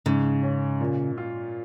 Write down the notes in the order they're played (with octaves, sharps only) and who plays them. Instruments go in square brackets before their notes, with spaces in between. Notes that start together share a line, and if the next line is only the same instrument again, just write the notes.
[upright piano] G#2 [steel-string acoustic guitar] C#3
[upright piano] C#4
A#2
F4